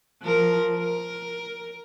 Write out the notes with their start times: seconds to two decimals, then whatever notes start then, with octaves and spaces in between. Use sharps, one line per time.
0.22 F3 A#4
0.78 A#4